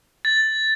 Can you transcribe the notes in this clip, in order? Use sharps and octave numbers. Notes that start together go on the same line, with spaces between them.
A6